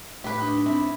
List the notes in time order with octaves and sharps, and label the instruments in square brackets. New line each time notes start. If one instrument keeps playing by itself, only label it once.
[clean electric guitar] A2 [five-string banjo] G4 B4
[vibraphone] D4 D#4
[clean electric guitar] C4 [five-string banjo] E4